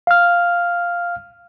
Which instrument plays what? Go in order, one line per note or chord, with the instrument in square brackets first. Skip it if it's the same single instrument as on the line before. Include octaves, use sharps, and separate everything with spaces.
[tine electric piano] F5 F6